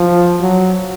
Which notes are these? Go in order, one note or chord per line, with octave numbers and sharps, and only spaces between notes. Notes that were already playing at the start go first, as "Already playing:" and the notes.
Already playing: F3
F#3